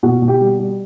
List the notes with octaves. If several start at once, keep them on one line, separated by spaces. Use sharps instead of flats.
B2 F#4
B2
G4
G3
G3